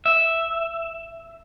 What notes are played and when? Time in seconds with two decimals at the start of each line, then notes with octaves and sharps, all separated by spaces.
0.06 E5